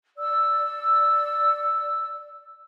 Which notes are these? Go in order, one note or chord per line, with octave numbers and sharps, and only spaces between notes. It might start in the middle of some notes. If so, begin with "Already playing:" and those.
D5 E6